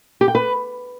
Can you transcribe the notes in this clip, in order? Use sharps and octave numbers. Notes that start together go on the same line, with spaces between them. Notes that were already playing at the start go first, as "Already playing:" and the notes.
G4
G5
B4